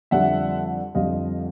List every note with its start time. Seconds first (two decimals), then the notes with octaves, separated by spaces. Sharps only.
0.11 F2 D3 G3 E5 F#5
0.95 F2 D3 G3 D#5 F5